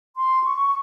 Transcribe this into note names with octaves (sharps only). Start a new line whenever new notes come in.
C6
C#6